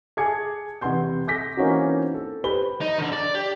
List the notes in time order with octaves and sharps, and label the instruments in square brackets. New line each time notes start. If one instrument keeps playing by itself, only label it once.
[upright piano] G#4 G#5 A5 D6 G#6 C#7
E2 C3 B4 F#5 C6 G6
D6 G6 A#6 B6
E3 A#3 C4 C#4 D#4 F#4
A4
G4 B4 C5 B5 G7
[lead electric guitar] D#4
D3 D#3
D5
G4